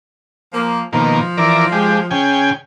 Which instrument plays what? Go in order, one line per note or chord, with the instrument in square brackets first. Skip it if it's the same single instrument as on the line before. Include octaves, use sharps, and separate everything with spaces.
[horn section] F3 A#3
[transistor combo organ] B2 D#3 A#3 [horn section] F3
[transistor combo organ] E3 A#4 D5
G#3 G4
C#3 G5 G#5